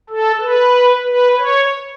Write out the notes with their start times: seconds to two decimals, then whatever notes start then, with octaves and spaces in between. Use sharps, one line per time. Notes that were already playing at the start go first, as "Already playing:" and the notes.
0.10 A4
0.41 B4
1.06 B4
1.38 C#5